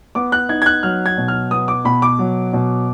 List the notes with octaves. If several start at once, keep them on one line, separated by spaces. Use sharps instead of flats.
B3 D6
F#6
D#4 G#6
G#6
F#6
F#3 F6
G#6
B2
F6
B3 D#6
D6
B2 B5
D6
F#3
B2